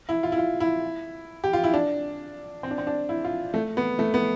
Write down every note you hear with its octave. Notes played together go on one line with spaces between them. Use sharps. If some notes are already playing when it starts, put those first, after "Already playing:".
E4
F4
E4
F4
E4
G4
F4
E4
D4
C4
D4
C4
D4
E4
F4
A3
B3
A3
B3